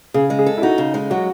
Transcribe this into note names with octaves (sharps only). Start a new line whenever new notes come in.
C#3 G#4
G#3
G#4
A4
E4
D#4 F#4
C#3
G#3
F#3 F#4